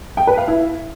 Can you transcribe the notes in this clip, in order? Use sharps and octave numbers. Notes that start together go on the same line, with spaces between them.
G5
B4
F5
E4